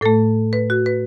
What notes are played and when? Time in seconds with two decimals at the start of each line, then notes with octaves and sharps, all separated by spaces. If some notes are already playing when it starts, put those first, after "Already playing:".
0.01 A2 A3 A4
0.53 B4
0.70 F#4
0.86 B4